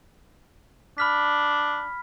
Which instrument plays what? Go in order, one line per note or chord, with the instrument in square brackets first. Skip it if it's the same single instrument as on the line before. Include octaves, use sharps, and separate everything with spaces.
[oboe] D4 [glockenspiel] B5 F6 B6